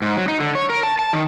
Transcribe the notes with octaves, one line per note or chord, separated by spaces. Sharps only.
G#2
F#3
D#4
D3
C#5
A#4
A5
A5
D#3